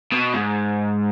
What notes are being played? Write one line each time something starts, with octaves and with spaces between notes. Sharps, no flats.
B2
G#2